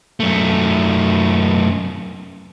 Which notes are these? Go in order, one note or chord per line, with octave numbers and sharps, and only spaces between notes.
F#2 A3